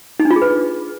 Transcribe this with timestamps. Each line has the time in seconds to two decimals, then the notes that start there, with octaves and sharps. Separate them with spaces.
0.20 D#4
0.25 D4
0.31 F4
0.36 G#4
0.42 B4